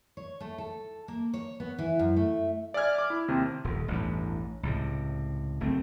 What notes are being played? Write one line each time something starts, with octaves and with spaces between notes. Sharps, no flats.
C#5
A3
A4
A#3
C#5
B3
E3
F#2
A3
D5 E5 G#5 F6 G#6
D6
E4
D#2 C3
D#1 D#2
A1 E2 G2
C#2 A2 C3
F#1 A3 C4